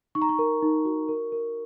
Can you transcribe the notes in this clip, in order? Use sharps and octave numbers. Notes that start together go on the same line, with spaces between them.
D#4 C#6
A#5
C#6
A#4
D#4
F#4
A#4
A#4